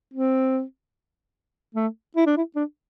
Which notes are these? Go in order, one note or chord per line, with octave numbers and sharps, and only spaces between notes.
C4
A3
E4
D4
E4
D4